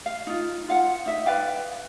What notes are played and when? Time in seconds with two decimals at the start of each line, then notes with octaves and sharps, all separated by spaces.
0.06 F5
0.27 D#4 F4
0.68 F4 F5 F#5
1.06 D#4 E5
1.26 B4 D5 F5 G5